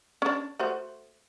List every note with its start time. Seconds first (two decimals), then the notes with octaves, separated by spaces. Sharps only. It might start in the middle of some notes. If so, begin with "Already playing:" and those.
0.22 C#4 D4
0.60 A3 F#4 C5